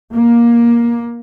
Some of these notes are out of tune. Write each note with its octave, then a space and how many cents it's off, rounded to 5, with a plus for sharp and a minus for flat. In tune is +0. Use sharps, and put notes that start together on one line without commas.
A#3 +15